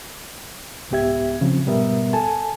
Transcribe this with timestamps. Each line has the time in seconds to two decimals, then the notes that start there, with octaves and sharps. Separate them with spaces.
0.91 C2 G#2 B3 G4 E5 G#6
1.41 C#3 F3 C4
1.66 G#2 B2 G3 B3 A#4 E5
2.13 A4 G#5 A5